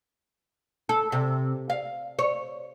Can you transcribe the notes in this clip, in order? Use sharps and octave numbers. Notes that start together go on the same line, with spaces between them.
A4
C3
F5
C#5